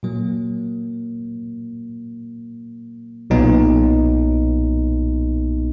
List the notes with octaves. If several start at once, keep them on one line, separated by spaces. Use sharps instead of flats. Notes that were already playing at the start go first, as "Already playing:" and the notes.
A#2 F#3 A#3
B1 A#2 F#3 B3 D#4